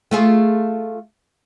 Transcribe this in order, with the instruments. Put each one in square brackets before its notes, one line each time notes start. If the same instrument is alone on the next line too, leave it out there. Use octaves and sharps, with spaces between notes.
[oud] A3 F4 G#4